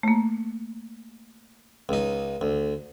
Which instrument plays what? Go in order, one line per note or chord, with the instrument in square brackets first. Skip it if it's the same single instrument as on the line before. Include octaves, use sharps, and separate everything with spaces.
[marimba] A3 A#3
[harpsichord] C#2 D#4
D2